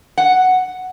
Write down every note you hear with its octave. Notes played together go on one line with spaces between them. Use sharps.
F#5